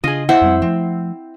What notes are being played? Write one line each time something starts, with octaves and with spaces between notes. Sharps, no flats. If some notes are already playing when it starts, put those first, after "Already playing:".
C#3 D4 F4 G#4 D#5
E4 C5 F#5
F2 G3 C4
F3 A3 C4